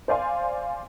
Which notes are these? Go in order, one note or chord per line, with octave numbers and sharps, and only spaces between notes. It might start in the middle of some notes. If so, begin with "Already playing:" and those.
C5 D5 F5 G#5 C6